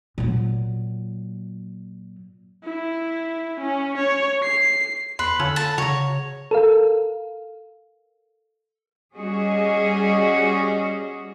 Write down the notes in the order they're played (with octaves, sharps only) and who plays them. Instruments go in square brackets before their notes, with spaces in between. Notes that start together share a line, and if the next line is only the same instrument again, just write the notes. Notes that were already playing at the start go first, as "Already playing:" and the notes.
[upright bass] A#2 F#3
[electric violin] E4
C#4
C#5
C7
[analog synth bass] E2 [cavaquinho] B4 [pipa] C6
[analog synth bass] D3 [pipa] C#4 F4 A4
[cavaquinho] A5
[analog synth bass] C#3 [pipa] F#4 A#5 [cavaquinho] C#5
[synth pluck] A4 A#4 F5
[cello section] G3 C#4 F#4 G#4 D#5